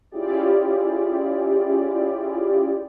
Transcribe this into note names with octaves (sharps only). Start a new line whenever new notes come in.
C#4 E4 F4 G4 G#4 D5